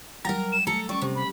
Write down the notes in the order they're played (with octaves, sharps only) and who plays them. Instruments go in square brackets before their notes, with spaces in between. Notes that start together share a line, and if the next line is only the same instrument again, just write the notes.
[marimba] F#3 G3 [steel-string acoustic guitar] A#4 A#5
[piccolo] E7
[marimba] A3 [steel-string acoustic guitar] A4 A#5 [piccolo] C#7
[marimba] G3 C#4 [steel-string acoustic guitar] D5 [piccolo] C#6
[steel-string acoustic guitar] C3
[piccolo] B5